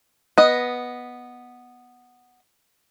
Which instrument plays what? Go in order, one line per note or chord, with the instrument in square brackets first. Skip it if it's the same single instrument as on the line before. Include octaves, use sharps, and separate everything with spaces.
[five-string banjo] B3 D#5